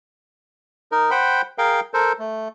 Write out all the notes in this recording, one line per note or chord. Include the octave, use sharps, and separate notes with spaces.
D#4 A#4
C5 F#5 G5 B5
G#4 A#4 F5 G5
A4 A#4 C5
A3